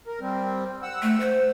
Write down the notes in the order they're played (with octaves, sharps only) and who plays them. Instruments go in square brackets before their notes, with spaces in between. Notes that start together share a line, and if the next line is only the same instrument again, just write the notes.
[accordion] A#4
G3 C4
F#5 E6
[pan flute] A3
C5